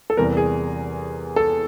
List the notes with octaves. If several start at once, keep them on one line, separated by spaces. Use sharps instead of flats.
A4
E2 C3 E3 G3 A#4
G#4
A4